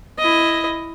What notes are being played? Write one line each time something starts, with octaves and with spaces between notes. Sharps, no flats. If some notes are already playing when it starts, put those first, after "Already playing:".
E4 D#5